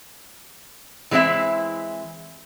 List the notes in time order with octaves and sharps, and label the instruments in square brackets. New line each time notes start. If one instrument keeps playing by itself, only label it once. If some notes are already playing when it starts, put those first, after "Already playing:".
[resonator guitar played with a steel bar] E3 G#3 C4 E4 E5